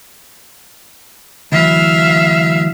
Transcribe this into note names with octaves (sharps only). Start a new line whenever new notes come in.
D2 E3 F#3 E5 F5